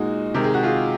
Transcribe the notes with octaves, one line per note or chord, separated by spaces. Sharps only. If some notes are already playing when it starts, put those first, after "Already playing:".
Already playing: A#2 G#3 D#4 F#4
C3 D#3 G#3 A#4
G#4
F#4
F4 G#4